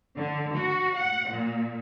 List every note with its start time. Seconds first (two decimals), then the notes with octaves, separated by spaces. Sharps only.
0.16 D3
0.54 F#4
0.97 F#5
1.30 A#2